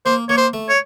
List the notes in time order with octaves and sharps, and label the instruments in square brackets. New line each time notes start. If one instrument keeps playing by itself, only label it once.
[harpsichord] A#3 [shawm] C5
[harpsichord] A#3 [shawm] C#5
[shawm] C5
[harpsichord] A3
[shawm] C#5